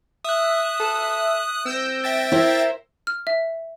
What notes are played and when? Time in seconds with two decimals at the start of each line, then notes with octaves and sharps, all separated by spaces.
0.25 E5 D#6 F#6
0.80 A4
1.66 C4 E6 G6 A#6
2.04 E5 G5 A6
2.32 E4 A#4 C5
3.07 F6
3.27 E5